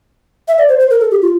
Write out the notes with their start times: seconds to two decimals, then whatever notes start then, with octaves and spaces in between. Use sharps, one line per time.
0.48 E5
0.58 D5
0.69 C5
0.79 C5
0.90 A#4
1.00 A4
1.11 G4
1.22 F4